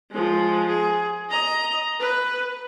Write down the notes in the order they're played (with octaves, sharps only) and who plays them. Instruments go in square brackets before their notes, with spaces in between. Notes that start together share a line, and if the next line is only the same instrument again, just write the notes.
[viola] F3 G#3
G#4
D#5 A#5
B4